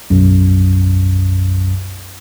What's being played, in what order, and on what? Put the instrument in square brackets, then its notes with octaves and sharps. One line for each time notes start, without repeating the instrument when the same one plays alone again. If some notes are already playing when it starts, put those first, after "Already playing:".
[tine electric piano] B1 F#2